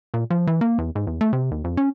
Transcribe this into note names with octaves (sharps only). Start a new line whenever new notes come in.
A#2
F3
E3
A#3
E2
G#2
E2
A3
C3
D#2
F2
C#4